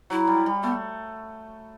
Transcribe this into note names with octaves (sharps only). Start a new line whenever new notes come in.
F#3 E4
G3
G3
A3 B3